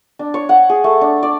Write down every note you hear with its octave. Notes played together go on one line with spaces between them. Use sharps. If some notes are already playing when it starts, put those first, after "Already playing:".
D4
C#5
F#5
G#4
A3
D4
D5